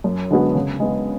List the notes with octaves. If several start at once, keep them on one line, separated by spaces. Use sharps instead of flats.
F#2
D3 G#3 B3 F#4
C#3
G#3 B3